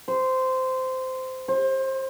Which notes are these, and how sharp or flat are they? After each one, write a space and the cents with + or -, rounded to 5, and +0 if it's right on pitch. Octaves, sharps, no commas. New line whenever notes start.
C5 -15
C5 +25